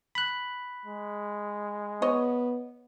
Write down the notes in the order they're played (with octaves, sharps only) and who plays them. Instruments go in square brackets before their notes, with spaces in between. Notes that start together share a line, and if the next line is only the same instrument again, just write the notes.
[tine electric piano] B5 F#6
[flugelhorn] G#3
[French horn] B3 [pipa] C#5 D#5